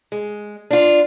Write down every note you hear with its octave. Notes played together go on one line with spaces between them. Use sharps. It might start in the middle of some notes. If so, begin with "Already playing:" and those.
G#3
D4 F4